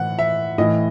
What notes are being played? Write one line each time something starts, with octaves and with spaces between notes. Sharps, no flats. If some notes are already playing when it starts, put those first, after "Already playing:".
Already playing: A2 E3 F#5
E5
A2 E3 D#5